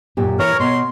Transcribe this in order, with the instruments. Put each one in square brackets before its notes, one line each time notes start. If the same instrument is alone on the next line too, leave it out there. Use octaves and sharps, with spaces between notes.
[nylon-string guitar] F#2 A#2 G4
[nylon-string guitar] E3 [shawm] A#4 [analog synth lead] C#5
[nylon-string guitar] B2 [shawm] C6